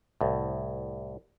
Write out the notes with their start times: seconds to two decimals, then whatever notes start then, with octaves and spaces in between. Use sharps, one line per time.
0.21 C2 A2